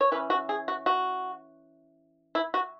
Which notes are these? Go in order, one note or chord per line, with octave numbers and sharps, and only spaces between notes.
C#5
E3 C#4 B4
F#4
G#4
F#4
F#4
E4
F#4